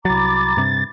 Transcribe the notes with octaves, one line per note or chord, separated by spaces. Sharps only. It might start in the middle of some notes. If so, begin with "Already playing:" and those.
C2 F#3 A#5 B5 D6 A6
G2 C3